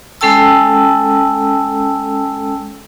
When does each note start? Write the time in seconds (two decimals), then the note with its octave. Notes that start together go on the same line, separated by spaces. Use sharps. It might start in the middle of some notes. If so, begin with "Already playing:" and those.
0.21 G#3 C#4 A4 G5 A5 E6